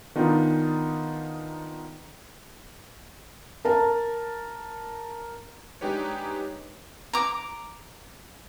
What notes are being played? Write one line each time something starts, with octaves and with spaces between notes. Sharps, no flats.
D#3 B3 D4 D#4 F4
A#4 A5
G#3 D4 D#4 G4 B4 C#5
A#5 D6